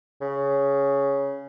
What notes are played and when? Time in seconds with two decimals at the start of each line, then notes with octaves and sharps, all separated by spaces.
0.21 C#3